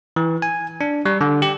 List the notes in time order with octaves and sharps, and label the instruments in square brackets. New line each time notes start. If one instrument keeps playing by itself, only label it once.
[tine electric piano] E3
G#5
D4
G3
D3
G4